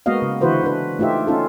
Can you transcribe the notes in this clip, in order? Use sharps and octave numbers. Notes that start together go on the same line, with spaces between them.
G#3 A#3 B3 F#4 D#5 F5
C#3
D3 E3 E4 F#4 B4 C5
D4 B4
A3 D#4 F4 G4 E5
C#4 D#4 F4 A4